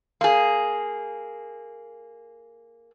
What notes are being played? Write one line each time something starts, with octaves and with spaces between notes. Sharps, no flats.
A#3 G#4